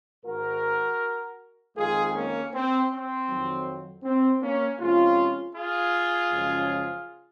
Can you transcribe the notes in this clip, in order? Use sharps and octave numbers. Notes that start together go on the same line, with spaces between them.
G#2 D#3 G#3 F#4 A#4
F2 D#3 G#3 F4 G#4
A#3 C#4
C4
C4
F2 D#3 F#3
C4
A#3 C#4
C3 F3 G#3 C#4 F4
F4 G#4
F#2 C#3 F3 G#3